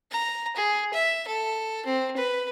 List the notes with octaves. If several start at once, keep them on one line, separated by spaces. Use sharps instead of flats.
A#5
G#4
E5
A4
C4
B4